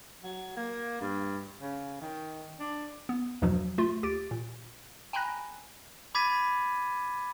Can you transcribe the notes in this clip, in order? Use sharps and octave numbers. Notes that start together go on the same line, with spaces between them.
F#3
A#3
G2
C#3
D#3
D4
B3
E2 G2 B2 F3 F#3 D4
A3 F4
D#2 G4 A6 D7
A#2
G5 G#5 A#5 B5 F#6 A#6
B5 D6 G#6 A6 B6 D#7